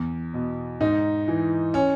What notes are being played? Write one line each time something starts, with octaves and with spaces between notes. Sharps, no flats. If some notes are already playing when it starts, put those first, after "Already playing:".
Already playing: E2
B2
G#2 D#4
E3
C#4